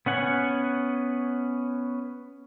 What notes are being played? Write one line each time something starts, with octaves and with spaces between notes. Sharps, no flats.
B3 C#4 F#5 G#5